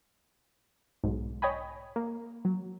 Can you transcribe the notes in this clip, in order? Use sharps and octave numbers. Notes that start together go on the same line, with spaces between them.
B1 G#2
C#5 D#5 G5 G#5 B5
A#3
F#3